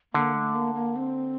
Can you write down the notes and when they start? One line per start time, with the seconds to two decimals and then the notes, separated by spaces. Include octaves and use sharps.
0.14 D3 A#3
0.34 A3
0.55 A#3
0.75 A#3
0.96 C4